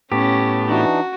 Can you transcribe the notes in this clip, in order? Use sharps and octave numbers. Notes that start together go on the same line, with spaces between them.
A2 B3 C#4 G4 A5
E3 D4 D#4 F#4